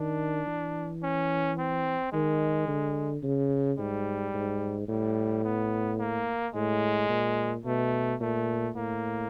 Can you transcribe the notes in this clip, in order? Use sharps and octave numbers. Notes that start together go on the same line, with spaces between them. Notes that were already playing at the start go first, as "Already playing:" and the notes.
Already playing: D#3 D4
E3
C#4
C4
D#3 G#3
D3
C#3
G#2 G3
G#2
A2 G3
B3
A#3
A2 G#3
A#2
B2 A3
A#2 A3
A2 A#3